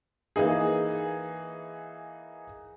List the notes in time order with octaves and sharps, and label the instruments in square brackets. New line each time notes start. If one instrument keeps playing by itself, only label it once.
[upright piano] E3 A#3 D#4 G#4